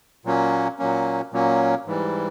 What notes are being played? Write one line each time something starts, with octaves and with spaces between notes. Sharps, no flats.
A#2 F#3 A#3 C#4
A#2 F#3 A#3 C#4
A#2 F#3 A#3 C#4
G#2 E3 G3